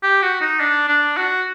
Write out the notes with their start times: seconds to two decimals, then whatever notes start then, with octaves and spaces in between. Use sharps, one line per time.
0.03 G4
0.22 F#4
0.41 D#4
0.60 D4
0.88 D4
1.17 F#4